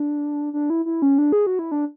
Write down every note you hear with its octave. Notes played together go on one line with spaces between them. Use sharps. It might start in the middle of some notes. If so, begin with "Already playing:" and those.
Already playing: D4
D4
E4
E4
C#4
D4
G#4
F#4
E4
D4